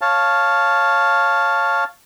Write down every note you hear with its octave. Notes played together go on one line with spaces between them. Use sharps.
C#5 F5 A5